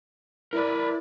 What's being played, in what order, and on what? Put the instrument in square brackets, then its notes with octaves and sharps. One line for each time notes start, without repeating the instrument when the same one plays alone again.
[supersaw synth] E4 D5 [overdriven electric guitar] A#4 B4